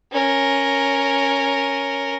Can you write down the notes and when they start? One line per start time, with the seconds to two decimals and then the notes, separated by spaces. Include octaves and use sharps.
0.12 C#4 A#4